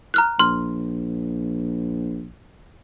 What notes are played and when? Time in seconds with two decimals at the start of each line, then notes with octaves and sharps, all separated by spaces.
0.14 A#5 F6 F#6
0.39 A#1 C6 F6